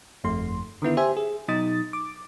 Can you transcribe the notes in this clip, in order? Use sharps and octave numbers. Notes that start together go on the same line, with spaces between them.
G1 F2 A3 C6
D3 D#3 B3 E4
G4 C5 E5 G#5
G#4
B2 F#3 D#4 D#6 A6
D6